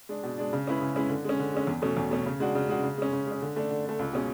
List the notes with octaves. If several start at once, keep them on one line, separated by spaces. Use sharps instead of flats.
G#3 D4
B2
G#3 D4
C#3
G#3 C#4 E4 B4
C#3
G#3 C#4 E4 B4
D3
G#3 C#4
D3
G#3 C#4
E2
B2 A3 C#4
E2
B2 A3 C#4
C#3
G#3 D4 F#4
C#3
G#3 D4 F#4
C#3
G#3 C#4
C#3
G#3 C#4
D3
A3 D4
D3
A3 D4
C#2
B2 G#3 C#4